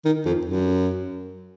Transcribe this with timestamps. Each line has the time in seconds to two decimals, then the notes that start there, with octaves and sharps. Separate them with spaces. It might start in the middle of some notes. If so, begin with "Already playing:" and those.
0.05 D#3
0.26 F2
0.45 F#2